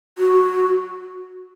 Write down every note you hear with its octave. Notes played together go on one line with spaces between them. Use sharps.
F#4